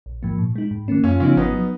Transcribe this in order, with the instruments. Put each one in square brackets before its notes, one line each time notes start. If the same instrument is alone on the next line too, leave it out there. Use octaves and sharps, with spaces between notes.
[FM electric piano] A#1
G#2 F3 A#3
A#2
G#3 D#4
G#2
D#3 A#3 C#4
[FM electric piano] F#2 [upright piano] C#4 F4
[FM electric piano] C#3 F3 B3 D#4 [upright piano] C#4 F4
[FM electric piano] G#1 [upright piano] B3 D#4
[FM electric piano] F#3